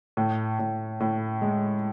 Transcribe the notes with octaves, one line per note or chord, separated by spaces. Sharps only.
A2
A2
A2
G#3